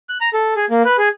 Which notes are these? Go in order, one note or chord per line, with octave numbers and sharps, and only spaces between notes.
F#6
A#5
A4
G#4
A#3
B4
G#4